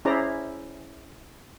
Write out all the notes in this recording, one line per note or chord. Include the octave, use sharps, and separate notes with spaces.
C#4 E4 G#4 C5 D5 A#5